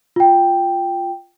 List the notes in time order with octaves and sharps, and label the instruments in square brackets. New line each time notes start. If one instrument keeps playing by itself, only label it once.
[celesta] F4 G5